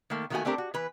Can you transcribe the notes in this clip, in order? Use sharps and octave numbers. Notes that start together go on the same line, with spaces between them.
D#3 A3 A#3
D#3 F3 A3 A#3 F#4 G#5
A3 C4 D4 G4 A#4
F#4
E3 B4